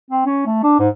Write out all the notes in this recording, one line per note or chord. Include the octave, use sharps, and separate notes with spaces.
C4
C#4
A3
D4
G#2